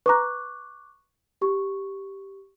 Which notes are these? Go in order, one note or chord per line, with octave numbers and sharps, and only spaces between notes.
B4 A#5 C#6 D6 F#6
G4 C#6